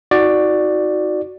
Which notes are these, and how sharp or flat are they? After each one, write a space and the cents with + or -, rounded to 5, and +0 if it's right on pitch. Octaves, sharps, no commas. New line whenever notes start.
D#4 +40 F#4 +0 D5 +10